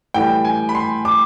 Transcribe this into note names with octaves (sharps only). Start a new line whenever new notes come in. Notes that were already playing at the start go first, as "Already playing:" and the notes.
A2 E3 G3 G5
G#5
B5
C6
D6